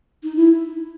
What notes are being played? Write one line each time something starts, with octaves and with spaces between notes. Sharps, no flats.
D#4
E4